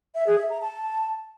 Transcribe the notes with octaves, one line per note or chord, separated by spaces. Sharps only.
E5
G#4
E5
A#5
A5